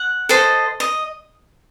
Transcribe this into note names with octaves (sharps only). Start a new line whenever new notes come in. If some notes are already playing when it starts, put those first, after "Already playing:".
Already playing: F#5
A4 C5 D#5
D#5